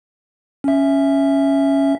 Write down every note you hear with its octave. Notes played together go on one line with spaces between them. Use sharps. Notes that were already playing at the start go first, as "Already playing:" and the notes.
C#4 E5